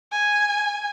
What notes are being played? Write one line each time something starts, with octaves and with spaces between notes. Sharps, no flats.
G#5